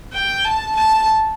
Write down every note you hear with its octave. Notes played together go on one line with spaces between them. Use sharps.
G5
A5
A5